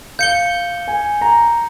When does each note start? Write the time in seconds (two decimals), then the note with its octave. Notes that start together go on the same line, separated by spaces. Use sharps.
0.19 F5 G6 C#7 G7
0.88 G#5
1.21 A#5